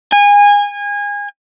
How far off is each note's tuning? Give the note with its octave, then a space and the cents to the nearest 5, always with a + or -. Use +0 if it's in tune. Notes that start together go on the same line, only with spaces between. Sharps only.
G#5 -25